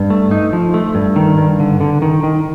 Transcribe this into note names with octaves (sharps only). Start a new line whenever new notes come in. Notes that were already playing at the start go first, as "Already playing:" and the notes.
Already playing: G2
A3
D#4
F3
A3
G2
D#3
G2
D3
D3
D#3
D#3